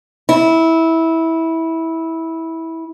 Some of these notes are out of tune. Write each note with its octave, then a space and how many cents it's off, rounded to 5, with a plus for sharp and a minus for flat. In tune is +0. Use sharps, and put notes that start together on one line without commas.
E4 -15